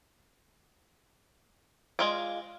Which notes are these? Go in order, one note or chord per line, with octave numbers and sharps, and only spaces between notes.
G#3 F4 D5